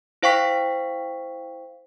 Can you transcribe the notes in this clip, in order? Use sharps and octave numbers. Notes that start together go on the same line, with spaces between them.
E4 C5 F5 G5 C#6 B6